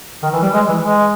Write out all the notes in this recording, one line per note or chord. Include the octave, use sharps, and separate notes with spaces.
D#3
E3
G3
G#3
E3
G#3